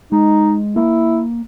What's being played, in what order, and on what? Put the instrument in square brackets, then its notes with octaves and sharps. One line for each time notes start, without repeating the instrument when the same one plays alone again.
[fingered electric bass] G#3 [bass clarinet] D#4
[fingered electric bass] A#3 [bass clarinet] E4